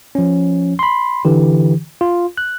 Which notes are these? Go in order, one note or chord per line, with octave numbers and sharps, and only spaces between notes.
F3 C#4
B5 C6
D3 E3 G4
F4
F#6